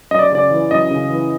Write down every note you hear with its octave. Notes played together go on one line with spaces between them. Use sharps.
F#2 D#5
D5
C#3 D5
E3
F#2 D#5
C#3
E3